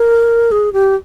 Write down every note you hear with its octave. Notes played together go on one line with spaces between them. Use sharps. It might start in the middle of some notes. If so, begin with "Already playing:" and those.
Already playing: A#4
G#4
G4